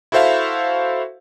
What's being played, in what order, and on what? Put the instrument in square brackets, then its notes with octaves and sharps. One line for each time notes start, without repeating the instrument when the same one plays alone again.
[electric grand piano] E4 F#4 A4 C5 E5 F5